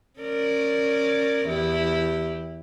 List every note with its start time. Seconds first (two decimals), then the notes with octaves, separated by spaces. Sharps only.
0.20 C#4 A#4 D5
1.48 E2 E4 G4